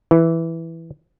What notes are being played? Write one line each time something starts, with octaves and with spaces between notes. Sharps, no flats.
E3